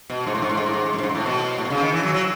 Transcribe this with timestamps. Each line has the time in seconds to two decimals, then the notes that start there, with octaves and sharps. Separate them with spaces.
0.10 B2
0.26 G#2
0.35 A2
0.42 G#2
0.50 A2
0.57 G#2
0.66 A2
0.73 G#2
0.86 G#2
0.93 F#2
0.98 A2
1.03 G#2
1.09 B2
1.15 A2
1.26 B2
1.58 A2
1.65 B2
1.70 C#3
1.81 D#3
1.92 E3
2.03 F#3
2.14 F#3